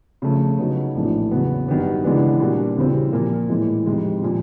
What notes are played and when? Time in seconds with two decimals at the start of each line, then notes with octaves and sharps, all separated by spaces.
0.22 C#3 F3 A3 C#4
0.58 C#3 F#3 B3 D#4
0.95 A#1 A2 E3 A3 D4
1.31 E2 C#3 F#3 B3
1.68 G2 D#3 F#3 B3
2.04 C#3 E3 G#3 B3 D4
2.40 A#2 G3 A#3 D4 F#4
2.77 D#2 C#3 E3 G3 C4
3.13 A#2 F3 A#3
3.49 A2 E3 G#3
3.86 F2 C3 D#3 G#3
4.22 A#2 F3